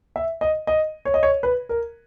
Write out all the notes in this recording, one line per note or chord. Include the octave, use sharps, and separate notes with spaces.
E5
D#5
D#5
C#5
D#5
C#5
B4
A#4